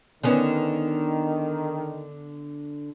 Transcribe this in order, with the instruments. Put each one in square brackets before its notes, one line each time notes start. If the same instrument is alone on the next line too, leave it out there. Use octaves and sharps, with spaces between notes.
[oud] D3 B3 C#4 [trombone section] D#3